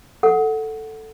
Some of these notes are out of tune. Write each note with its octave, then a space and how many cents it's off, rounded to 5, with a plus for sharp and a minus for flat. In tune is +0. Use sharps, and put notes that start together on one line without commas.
A4 +5 F#5 +0